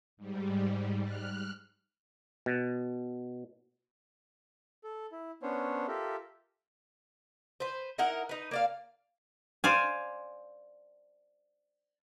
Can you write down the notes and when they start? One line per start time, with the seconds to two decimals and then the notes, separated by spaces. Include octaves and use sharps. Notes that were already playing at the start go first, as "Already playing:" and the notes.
0.17 G#2 G3
1.03 F6 F#6
2.46 B2
4.84 A4
5.12 E4
5.43 B3 C#4 D4 C5 C#5
5.88 F4 G4 A4 A#4 E5
7.60 B4 C5
7.98 D#4 E4 A#4 F#5
8.29 D#4 B4
8.51 A#3 D5 F5
9.64 C5 D5 F5 G#5